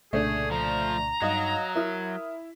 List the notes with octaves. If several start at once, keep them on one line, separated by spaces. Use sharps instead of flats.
C2 A#2 C#3 A3 D4 G#4
F3 A#5
G2 F#3 D#4 D#5 F5
E4 A#4 D#6 F6